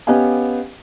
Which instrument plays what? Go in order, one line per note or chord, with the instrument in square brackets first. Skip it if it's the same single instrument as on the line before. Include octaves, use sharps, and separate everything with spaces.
[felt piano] B3 C#4 G4 D#5 F5 G#5